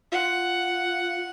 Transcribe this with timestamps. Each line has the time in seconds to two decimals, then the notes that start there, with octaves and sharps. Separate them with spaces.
0.12 F4 F#5